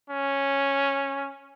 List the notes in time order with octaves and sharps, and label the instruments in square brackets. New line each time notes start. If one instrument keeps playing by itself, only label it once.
[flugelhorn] C#4